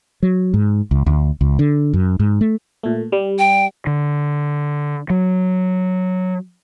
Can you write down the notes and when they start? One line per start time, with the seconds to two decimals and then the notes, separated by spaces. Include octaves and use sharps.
0.23 F#3
0.54 G#2
0.91 C#2
1.06 D2
1.41 C#2
1.59 D3
1.93 F#2
2.20 G#2
2.41 A3
2.83 A#2 A3
3.12 G3
3.39 G5
3.87 D3
5.10 F#3